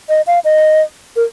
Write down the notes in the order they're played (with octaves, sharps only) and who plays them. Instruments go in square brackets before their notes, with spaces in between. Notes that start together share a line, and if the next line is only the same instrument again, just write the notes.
[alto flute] D#5
F5
D#5
A#4